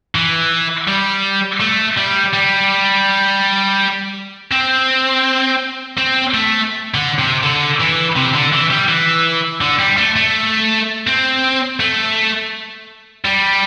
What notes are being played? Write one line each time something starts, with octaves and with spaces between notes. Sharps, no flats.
E3
G3
A3
G3
G3
C4
C4
A3
D3
C3
D3
E3
C3
D3
E3
G3
E3
D3
G3
A3
A3
C4
A3
G3